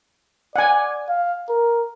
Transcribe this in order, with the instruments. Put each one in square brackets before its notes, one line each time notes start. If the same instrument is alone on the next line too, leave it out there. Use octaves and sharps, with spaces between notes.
[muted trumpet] D5 [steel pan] F#5 G#5
[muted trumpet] F5
A#4